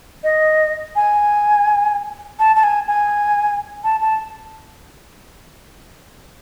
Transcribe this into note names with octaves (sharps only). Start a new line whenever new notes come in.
D#5
G#5
A5
A5
G#5
G#5
A5
A5